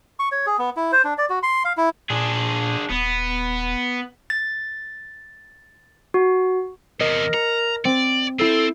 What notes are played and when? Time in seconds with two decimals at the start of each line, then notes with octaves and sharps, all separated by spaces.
0.19 C#6
0.32 C#5
0.46 G#4
0.59 B3
0.77 E4
0.92 C5
1.04 D4
1.18 D5
1.29 F#4
1.43 C6
1.65 F5
1.77 E4
2.10 A#2 D4 G#4
2.90 D#1 B3
4.30 A6
6.14 F#4
7.00 E2 C3 A#4 D#5
7.34 A#5 C#7
7.85 C4 D5
8.39 C4 E4 A4 D#7